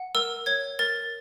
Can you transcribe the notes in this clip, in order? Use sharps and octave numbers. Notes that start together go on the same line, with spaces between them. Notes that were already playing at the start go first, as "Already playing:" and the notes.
Already playing: F#5
A#4 E6
C#5 G#6
A#4 A6